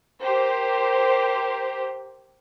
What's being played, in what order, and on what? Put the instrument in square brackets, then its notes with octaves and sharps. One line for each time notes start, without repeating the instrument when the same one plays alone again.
[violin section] G4 A#4 C5